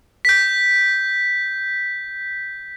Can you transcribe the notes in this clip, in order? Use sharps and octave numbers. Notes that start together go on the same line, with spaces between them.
G6 B6